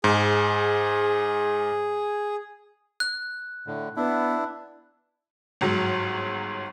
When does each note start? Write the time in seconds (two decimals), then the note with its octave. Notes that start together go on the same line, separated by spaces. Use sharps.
0.04 G#2 G#4
3.00 F#6
3.67 A2 D3
3.96 B3 D4 E4
5.61 G1 G#2 F#3